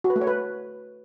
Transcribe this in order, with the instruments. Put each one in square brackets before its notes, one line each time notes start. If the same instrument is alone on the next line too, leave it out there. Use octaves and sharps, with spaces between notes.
[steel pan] F#4
B4
A3
C#5
B4